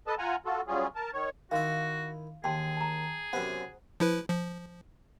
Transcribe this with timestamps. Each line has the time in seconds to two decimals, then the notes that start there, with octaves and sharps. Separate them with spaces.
0.07 A4 B4 D#5 A5
0.18 F4 F#5 G#5 A#5
0.45 F4 F#4 A4
0.68 F#3 G3 C#4 F4 G#4
0.95 A#4 A5
1.13 D#3 C#5
1.51 D#3 E4 F#4 F5 C6
2.44 D#2 G#4 G5 A5 C6
2.77 A5 A#5
3.33 F#2 C3 B3 C5 F#5
4.00 F3 E4 B4
4.30 F3